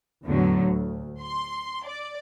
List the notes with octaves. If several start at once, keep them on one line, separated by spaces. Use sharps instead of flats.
E2 A2 D3 F#3
D2
C6
D5